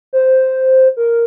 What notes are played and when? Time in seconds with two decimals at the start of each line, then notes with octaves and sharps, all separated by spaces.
0.13 C5
0.97 A#4